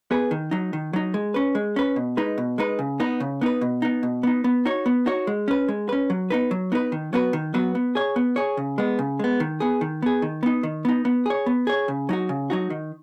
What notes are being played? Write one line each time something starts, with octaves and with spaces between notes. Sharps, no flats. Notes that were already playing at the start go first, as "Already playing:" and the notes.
B3 G#4 B4
D#3
F#3 D#4
D#3
F#3 D#4
G#3
C#4 B4
G#3
C#4 B4
B2
G#3 D#4 B4
B2
G#3 D#4 B4
C#3
B3 D#4 B4
C#3
B3 D#4 B4
B2
B3 D#4
B2
B3 D#4
B3
D#4 F#4 C#5
B3
D#4 F#4 C#5
G#3
C#4 B4
G#3
C#4 B4
F#3
B3 D#4 B4
F#3
B3 D#4 B4
D#3
F#3 B3 F#4 B4
D#3
F#3 B3 F#4 B4
B3
G#4 C#5
B3
G#4 C#5
C#3
G#3 B3
C#3
G#3 B3
D#3
B3 G#4
D#3
B3 G#4
D#3
B3 D#4
D#3
B3 D#4
B3
G#4 C#5
B3
G#4 C#5
C#3
F#3 D#4 F#4
C#3
F#3 D#4 F#4
D#3